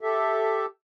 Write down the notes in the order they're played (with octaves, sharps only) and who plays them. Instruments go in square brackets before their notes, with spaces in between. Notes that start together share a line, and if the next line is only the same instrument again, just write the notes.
[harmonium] G4 A4 E5